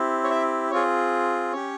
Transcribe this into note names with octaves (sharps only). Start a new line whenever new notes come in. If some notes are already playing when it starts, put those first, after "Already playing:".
Already playing: C4 E4 G4
C#5
E5
C4 F4 G#4 C#5
C#4 G4 C#5